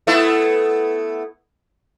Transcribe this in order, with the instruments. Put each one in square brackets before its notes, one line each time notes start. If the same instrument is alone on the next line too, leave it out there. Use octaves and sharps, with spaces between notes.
[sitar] A3 B3 E4